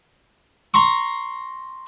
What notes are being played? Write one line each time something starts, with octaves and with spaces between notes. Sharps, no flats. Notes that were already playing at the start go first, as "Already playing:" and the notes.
A#5 C6 C#6